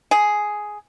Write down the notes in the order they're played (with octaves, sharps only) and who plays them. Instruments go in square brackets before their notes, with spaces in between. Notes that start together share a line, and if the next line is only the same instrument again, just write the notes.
[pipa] G#4